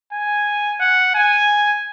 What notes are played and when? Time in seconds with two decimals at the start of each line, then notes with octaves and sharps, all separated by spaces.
0.12 G#5
0.80 F#5
1.15 G#5